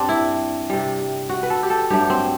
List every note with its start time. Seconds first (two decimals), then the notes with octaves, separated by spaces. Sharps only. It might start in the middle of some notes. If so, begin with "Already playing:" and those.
Already playing: G2 C4 D4
0.09 E4
0.70 C3 G3
1.29 F#4
1.43 B4
1.50 A4
1.63 G4
1.70 A4
1.90 G2 F#3 A3 G4
2.10 C4